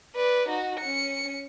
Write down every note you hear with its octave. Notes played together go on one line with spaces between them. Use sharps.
B4 D5
D#4 F#4
C#4 C#7